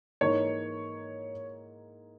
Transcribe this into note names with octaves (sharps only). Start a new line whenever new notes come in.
G#2 E3 A#3 D#4 C#5